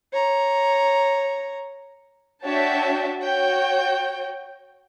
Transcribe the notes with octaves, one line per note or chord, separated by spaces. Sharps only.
C#5 A#5
D4 F#4 C#5 E5 G5 A5
F#4 C#5 G5